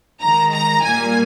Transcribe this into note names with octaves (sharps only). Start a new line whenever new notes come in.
D#3 G#3 A#5
A#5
A#2 G3 A#3 G#5